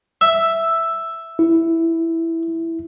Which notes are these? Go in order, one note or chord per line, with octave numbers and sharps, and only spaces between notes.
E5
E4